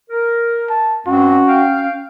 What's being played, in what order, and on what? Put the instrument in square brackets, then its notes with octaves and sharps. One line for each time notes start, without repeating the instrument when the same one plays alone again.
[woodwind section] A#4
[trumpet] A5
[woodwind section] G2 G#3 C4 [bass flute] C#4 [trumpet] F#4
[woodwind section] F5 G5